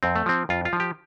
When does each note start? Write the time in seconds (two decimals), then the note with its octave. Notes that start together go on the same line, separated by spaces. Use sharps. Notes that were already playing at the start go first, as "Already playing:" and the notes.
0.03 F2 C4
0.16 A3
0.26 F3 C4
0.49 F2 F4
0.65 F4
0.73 F3
0.80 G4